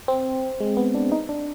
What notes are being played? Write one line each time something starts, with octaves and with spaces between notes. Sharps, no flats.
C4
G#3
B3
D4
D#4
D4